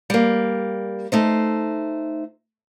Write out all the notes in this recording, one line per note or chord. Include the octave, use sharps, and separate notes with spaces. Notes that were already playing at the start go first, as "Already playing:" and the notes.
G3 A#3
A3 D#4 C5